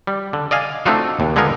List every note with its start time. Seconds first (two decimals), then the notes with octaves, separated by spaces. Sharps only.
0.07 G3
0.33 D3
0.51 D5 D#5 F5 G#5
0.86 A3 C4 D4 D#4 F4 F#4
1.20 D#2
1.36 D3 G#3 B3 D#4 F4 A#4